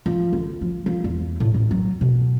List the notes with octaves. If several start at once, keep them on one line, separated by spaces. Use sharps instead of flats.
F3
D2
F3
F3
E2
A2
A1
F#3
B2